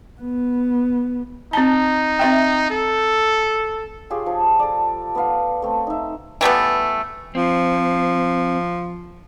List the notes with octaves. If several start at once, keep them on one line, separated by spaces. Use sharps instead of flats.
B3
C4 D#4 A5
C4 E5 G5
A4
F4 G4 G#4 C#5
F3
A4 D5
B3 B4 F5 F#5
A3 C4
D#4 E5
E3 G3 A3 B3
F3 C4